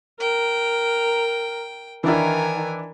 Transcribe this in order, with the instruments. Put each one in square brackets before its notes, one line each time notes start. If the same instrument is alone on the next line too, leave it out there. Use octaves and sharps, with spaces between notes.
[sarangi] A#4 [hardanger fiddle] G5
[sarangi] D#3 [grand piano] E3 D4 E4 [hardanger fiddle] A#4 G#5